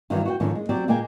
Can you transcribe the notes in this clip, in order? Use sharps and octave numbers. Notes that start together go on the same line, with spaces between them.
G2 D#3 E3 F#3 G3
F#4 C5 G5
G#2 D3 D#3 F3 C#4
G#3
F#3 C4 G4 D5
A#2 G#3 A#3 G5 G#5